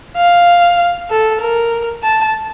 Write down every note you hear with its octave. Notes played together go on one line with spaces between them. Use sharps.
F5
A4
A#4
A5